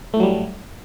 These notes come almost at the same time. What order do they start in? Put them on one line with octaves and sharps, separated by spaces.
A3 A2 F#3 G3